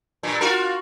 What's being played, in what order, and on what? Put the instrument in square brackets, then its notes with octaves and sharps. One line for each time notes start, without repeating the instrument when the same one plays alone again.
[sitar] G2 A#2
F4 F#4 A#4